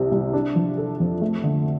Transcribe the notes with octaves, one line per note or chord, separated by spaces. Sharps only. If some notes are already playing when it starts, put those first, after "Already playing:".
Already playing: C2 C3
C2
D4
F3
A4
F2
A3
D3